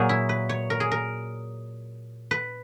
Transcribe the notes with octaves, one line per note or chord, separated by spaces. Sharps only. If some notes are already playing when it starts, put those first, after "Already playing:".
Already playing: A#2 F#3 A#3 G#4
E4
B4
C#5
A#4
G#4
A#4
B4